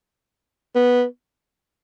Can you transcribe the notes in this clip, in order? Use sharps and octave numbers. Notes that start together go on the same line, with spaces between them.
B3